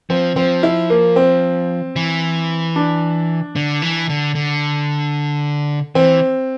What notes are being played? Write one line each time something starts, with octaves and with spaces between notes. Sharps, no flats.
F3 C4
F3 C4
E4
A#3
C4
E3
D4
D3
E3
D3
D3
E3 C4